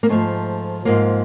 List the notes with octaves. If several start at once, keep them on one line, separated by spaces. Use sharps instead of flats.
A#3
G#2 F3 A3
G#2 F3 A#3